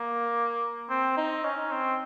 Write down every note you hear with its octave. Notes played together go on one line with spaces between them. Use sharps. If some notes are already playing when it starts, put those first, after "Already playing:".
Already playing: A#3
C4
D#4
C#4
C4